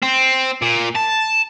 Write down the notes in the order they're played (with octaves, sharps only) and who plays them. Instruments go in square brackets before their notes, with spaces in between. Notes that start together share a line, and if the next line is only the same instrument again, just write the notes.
[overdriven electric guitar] C4
A#2
A5